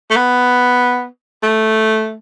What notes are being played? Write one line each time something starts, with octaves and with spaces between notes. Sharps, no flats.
A3
B3
A3